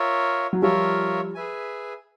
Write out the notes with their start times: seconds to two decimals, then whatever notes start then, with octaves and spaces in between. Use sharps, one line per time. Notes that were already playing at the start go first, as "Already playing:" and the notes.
Already playing: F4 A#4 C#5 E5
0.53 F#3
0.62 F3 G3 F4 A#4 C#5 E5
1.35 G#4 B4 E5 G#5